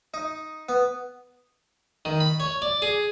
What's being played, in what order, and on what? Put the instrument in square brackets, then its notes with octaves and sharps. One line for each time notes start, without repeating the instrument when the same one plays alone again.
[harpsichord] D#4
B3
D#3
B5
C#5
D5
G#4